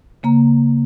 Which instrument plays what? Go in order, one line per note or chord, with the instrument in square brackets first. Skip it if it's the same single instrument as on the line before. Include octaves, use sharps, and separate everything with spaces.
[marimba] C#3 A#3 A#5